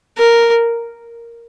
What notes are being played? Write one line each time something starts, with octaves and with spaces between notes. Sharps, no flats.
A#4